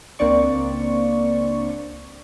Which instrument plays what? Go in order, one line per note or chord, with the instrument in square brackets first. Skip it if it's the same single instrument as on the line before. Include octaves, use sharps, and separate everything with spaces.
[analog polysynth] C#2 A#3 C4 D4 D5 C#6